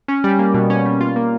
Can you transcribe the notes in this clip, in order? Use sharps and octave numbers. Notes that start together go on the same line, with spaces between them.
C#4
G3
A#3
B2
C#4
G3
F4
A#3